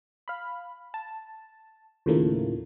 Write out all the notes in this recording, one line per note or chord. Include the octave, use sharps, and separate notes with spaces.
F5 B5
A5
D#2 A2 C#3 F3 A3 A#3